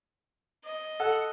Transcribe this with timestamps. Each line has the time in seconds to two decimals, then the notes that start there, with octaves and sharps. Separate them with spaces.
0.64 D#5
1.00 A4 F#5